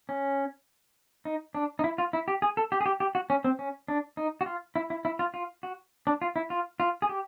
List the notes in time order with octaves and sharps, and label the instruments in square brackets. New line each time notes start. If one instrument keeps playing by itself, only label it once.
[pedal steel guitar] C#4
D#4
D4
D#4
E4
F4
E4
G4
G#4
A4
G4
G#4
G4
G4
F#4
C#4
C4
C#4
D4
D#4
F#4
F4
E4
E4
E4
F4
F4
F#4
D4
F4
E4
F4
F4
G#4
G4